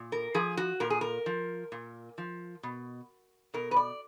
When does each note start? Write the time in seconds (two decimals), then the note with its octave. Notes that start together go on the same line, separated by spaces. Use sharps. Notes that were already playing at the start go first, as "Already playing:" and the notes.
Already playing: A#2
0.12 A#4
0.34 F3 G#4
0.57 F#4
0.80 A#2 A#4
0.90 G#4
1.01 A#4
1.26 F3
1.72 A#2
2.18 F3
2.63 B2
3.54 B2 A#4
3.71 B4
3.76 D5